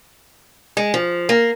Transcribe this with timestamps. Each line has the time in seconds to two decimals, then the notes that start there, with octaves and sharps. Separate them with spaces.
0.77 G#3
0.94 F3
1.29 A#3